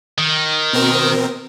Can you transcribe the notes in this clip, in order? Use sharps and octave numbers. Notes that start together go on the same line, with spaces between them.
D#3
B2 C4 A#4